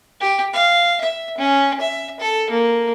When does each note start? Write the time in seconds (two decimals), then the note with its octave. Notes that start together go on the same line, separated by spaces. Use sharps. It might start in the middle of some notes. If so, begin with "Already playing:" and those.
0.20 G4
0.53 F5
1.01 E5
1.38 C#4
1.81 E5
2.20 A4
2.50 A#3